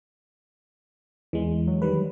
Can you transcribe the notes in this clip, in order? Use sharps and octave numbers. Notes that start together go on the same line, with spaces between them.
E2 E3 G#3
F#3
D#3 G3 B4